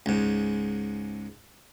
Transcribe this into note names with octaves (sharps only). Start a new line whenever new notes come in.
C#2 G#2